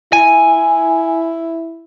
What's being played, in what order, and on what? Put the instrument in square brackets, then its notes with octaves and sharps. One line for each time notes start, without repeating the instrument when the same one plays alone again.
[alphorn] E4 [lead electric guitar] G#5